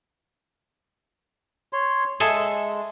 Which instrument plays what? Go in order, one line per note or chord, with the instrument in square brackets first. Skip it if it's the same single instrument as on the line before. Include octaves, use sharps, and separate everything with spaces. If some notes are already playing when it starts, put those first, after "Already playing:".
[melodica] C#5 C6
[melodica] G#3 [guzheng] G#4 A4 E5